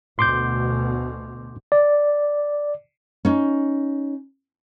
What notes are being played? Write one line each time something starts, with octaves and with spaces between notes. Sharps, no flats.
D2 B2 C6 D6 G6
D5
C#4 D#4